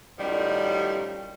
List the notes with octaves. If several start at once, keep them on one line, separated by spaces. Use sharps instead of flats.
F#2 A2 D#3 F3 G3